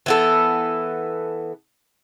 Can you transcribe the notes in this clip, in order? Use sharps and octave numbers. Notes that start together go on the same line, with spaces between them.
E3 B3 A4